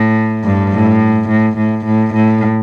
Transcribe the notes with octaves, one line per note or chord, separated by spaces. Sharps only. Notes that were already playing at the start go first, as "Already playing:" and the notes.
Already playing: A2
G2
A2
A2
A2
A2
A2